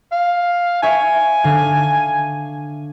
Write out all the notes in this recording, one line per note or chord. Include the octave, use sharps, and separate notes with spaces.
F5
C#5 E5 G#5 G#6
D3 F5 D#7